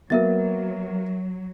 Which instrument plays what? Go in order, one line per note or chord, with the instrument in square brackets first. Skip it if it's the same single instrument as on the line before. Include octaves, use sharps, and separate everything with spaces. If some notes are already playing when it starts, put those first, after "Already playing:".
[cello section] F#3 [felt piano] A#3 B3 F#4 [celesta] A#4 E5 A6